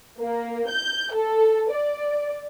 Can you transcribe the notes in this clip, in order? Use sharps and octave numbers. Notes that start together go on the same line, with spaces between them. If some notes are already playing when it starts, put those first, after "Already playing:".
A#3
G6
A4
D5